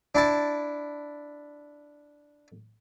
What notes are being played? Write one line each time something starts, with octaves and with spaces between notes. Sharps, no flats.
D4 E4 A5